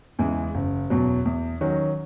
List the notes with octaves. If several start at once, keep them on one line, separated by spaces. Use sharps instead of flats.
E2 C#3 E3 G#3
F#1
E2 B2 F#3
E2
D#3 F#3 C#4 F#4